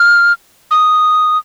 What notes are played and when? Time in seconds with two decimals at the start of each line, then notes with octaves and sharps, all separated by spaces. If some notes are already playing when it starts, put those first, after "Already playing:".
Already playing: F6
0.71 D#6